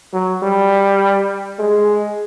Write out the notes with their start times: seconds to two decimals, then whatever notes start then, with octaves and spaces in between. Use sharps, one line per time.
0.13 F#3
0.43 G3
1.59 G#3